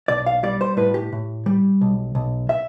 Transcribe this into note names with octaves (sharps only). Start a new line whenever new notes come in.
B1 D5
F5
G3 D5
C5
A2 B4
G4
A2
G3
B1
B1
E5